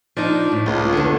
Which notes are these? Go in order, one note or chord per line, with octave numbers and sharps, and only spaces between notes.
F3 D4 D#4
A2
C#2 F4
E2 D3